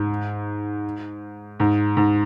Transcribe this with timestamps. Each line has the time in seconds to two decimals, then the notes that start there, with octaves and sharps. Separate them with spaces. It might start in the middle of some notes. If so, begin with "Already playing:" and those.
Already playing: G#2
1.60 G#2
1.97 G#2